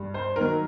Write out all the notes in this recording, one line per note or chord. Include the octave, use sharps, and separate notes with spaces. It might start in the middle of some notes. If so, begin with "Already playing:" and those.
Already playing: G2
C5
D#3 F#3 A#4